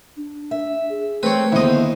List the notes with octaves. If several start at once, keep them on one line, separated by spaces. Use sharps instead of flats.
D4
E5
G#4
A3 C4 B4 C#5
D#2 D3 B3 E4 C5 D#5